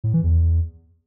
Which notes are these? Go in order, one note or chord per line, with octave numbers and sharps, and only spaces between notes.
A2
E3
E2